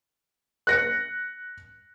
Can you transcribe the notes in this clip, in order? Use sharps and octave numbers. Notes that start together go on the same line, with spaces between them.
F#6 A#6 C#7